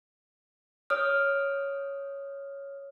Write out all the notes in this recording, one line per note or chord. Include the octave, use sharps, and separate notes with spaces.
C#5 D#6 F6